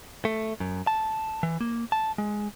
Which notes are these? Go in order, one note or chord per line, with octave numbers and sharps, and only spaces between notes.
A3
F#2
A5
E3
A#3
A5
G#3